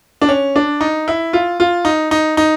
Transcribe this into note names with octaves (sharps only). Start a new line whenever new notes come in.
D4
C#4
D4
D#4
E4
F4
F4
D#4
D#4
D#4